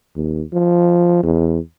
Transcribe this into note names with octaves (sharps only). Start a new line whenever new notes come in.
D#2
F3
E2